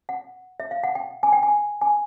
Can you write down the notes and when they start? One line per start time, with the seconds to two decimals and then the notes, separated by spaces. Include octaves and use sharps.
0.09 F#5
0.60 E5
0.71 F5
0.84 F#5
0.95 G5
1.23 G#5
1.33 G5
1.43 G#5
1.81 G#5